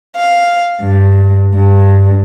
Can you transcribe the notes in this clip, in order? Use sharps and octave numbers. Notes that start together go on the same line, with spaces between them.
F5
G2
G2